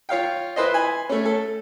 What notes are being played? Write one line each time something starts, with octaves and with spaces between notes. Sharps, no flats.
F4 C#5 F5 G5
E4 B4 C5 D#5
G#5 B5
A3 C#4
A4